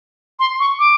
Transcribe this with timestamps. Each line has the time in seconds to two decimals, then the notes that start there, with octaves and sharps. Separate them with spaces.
0.39 C6
0.60 C#6
0.79 D6